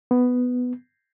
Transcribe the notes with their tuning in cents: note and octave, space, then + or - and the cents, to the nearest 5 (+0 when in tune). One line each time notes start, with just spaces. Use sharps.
B3 +5